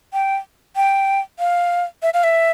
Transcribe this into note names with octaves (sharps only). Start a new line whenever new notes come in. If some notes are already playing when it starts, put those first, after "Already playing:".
G5
G5
F5
E5
F5
E5